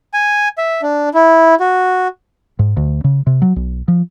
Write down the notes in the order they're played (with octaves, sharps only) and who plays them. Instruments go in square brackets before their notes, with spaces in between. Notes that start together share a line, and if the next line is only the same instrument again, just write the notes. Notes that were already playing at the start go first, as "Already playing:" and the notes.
[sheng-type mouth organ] G#5
E5
D4
E4
F#4
[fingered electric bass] G#2
D2
C#3
C3
F#3
B1
F3